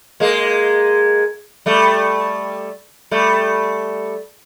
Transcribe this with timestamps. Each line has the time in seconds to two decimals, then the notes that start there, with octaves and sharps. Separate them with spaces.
0.20 G#3 A#3
1.66 G3 A3
3.11 G3 A3